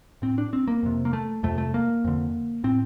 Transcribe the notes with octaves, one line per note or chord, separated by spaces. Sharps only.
A2 C4
D4
C4
A#3
F2 C3
A#3
A3
F2 C3 A3
A3
A#3
F2 D3
A2 C4